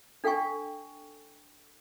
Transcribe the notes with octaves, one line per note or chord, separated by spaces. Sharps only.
D4 A4 F5 G5 G#5 C#6